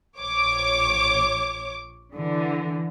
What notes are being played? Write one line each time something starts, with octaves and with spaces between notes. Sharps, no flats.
A#1 C#5 D6
D3 E3